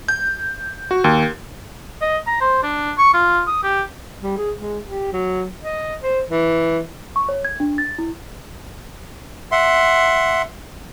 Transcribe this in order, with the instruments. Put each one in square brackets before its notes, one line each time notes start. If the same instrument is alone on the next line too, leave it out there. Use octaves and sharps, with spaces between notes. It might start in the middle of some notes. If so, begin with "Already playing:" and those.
[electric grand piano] G6
F#4
D#2
[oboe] D#5
A#5
C5
D4
C#6
F4
D#6
G4
[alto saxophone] G3
G#4
G#3
G4
F#3
D#5
C5
E3
[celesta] C#6
C#5
G#6
D4
A6
E4
[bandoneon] E5 F#5 C6